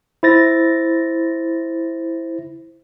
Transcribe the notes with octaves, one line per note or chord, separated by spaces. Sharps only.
E4 C5 A6 A#6